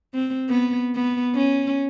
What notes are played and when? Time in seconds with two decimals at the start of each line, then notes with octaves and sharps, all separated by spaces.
0.14 C4
0.49 B3
0.95 B3
1.35 C#4